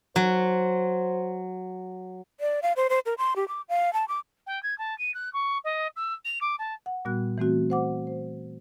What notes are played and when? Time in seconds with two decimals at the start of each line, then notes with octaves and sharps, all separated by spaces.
0.16 F#3 C5
2.40 D5
2.62 F5
2.76 C5
2.90 C5
3.06 A#4
3.18 C6
3.36 G4
3.48 D6
3.69 F5
3.93 A5
4.08 D6
4.47 G5
4.63 G#6
4.78 A5
4.98 D#7
5.14 F#6
5.33 C#6
5.64 D#5
5.96 E6
6.25 F7
6.41 D6
6.59 A5
6.86 F#5
7.05 A#2 G3 B3 F#4 F#6
7.38 E3 A3 C4 F#4
7.70 C5 F#5 D6
8.07 C5